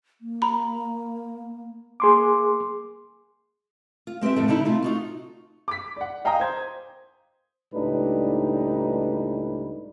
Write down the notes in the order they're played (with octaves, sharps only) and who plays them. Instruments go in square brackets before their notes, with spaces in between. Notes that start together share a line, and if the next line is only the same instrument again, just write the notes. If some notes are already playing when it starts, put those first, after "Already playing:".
[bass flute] A#3
[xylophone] A#5 B5
[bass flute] A#3 [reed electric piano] G#4 C6 D6
[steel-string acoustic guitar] F4
G#3 C4 G4 B4 E5
F2 A2 A3
D3 G3 D#4 E4
C3 A3 F4
D#4 F4 F#4
[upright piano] D6 B6
D5 F#5
D#5 F5 G5 G#5 A#5 D#6
C5 G#6
[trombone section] C#2 A2 G3 D4 D#4 B4